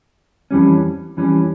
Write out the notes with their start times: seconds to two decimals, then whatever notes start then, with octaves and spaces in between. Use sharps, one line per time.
0.51 F2 E3 G3 C#4
1.17 F2 E3 G3 C#4